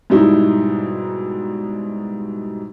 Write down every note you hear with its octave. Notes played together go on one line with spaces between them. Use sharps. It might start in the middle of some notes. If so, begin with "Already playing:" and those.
G#2 B2 G3 D#4 E4